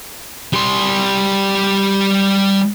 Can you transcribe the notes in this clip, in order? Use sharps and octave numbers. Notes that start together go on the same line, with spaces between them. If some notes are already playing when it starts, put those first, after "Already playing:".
G3 C6